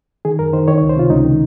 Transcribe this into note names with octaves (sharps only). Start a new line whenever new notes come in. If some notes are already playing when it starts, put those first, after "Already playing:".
D#3 G#4
F#2 A#4
D#3 C5
D#3 C#5
C#5
C#2
C5
C3 F4
C#2 D#4
D#3